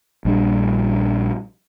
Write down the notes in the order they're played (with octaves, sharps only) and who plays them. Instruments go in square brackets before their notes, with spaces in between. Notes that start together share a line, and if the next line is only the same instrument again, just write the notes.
[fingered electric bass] A#1 G3 D4